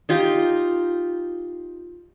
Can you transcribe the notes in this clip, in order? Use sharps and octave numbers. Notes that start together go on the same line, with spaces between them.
D#4 F4 G4 A#5